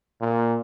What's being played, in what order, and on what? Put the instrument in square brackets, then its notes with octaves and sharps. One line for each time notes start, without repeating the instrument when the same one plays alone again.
[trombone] A#2